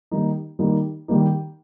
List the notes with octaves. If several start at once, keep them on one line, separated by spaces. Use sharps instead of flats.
D#3 G3 A#3 D#4
D#3 G3 A#3 D#4
D#3 G3 A#3 D#4